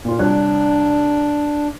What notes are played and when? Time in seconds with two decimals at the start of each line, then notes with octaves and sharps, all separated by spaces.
0.05 A#2 F4
0.19 C2 D4 C#5 F#6